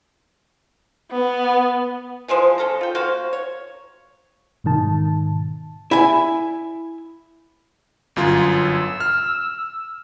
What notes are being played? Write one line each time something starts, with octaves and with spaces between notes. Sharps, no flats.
B3
E3 F3 G#3 C5
C#4 A4 F5 A#5
F4 G5
A#3 F#4 C5 F5
C#5
G#2 B2 D#3 A5
E4 G#5
G1 F#2 F4
E6
F6